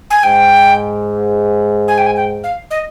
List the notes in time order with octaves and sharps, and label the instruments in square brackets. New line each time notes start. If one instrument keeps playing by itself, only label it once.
[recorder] G#5
[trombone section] G#2 [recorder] G5
[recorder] G#5
G5
G#5
G5
F5
D#5